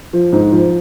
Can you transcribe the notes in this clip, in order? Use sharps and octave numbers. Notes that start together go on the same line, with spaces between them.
F3
G#2
F3